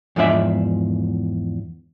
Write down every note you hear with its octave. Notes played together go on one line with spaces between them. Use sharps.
E2 G#2 F3 D4 E5